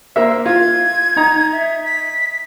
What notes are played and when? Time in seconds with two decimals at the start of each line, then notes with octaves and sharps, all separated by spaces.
0.16 A#3 C5 E5
0.46 F4 G#6
1.16 D#4 A#5
1.52 E5
1.84 B6